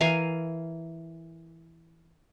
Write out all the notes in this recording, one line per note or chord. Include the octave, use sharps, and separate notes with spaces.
E3 A#4 F5 G#5